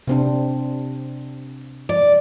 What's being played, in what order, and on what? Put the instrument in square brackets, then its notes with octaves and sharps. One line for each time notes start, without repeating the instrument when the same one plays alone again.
[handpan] C3 C4 D4
[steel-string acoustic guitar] D5